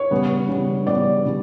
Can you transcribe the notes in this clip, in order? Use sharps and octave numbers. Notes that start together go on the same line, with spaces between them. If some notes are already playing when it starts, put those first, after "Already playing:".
Already playing: C#5
C#3 G3 B3
C#3 G3 B3
C#3 G3 B3 D5
C#3 G3